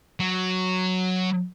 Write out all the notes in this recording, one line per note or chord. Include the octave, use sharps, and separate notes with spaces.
F#3